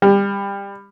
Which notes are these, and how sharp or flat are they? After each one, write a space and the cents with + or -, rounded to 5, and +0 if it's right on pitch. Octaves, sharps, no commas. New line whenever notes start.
G3 +25